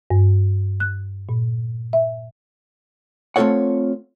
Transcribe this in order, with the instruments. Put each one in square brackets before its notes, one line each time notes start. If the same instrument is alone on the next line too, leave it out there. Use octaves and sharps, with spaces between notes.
[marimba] G2
F#6
A#2
E5
[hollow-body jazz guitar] A3 C4 F4 A4 C#5 F#5